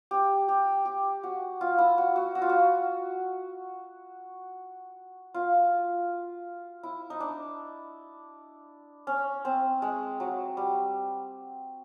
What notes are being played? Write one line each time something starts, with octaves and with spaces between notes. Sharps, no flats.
G4
G4
G4
F#4
F4
E4
F#4
F#4
F#4
F4
F#4
F4
E4
D#4
D4
C#4
C4
G#3
F#3
G3